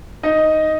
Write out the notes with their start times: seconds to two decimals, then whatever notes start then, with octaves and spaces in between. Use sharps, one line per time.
0.23 D#4 D#5